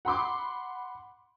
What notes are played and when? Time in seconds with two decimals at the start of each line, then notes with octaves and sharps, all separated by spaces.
0.05 F#5 B5 C6 D6